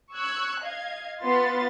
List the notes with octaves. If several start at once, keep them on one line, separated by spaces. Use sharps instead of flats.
C#6 E6 F#6 G#6
D#5 F5 G#6
B3 F4 B4 C6 A6